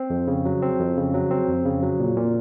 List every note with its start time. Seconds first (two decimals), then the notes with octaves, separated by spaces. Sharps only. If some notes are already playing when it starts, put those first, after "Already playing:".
Already playing: C4
0.10 F2
0.27 C#3
0.45 F#3
0.63 C4
0.79 F2
0.97 C#3
1.14 F#3
1.31 C4
1.49 F2
1.65 C#3
1.83 F#3
1.99 A#2
2.17 A#2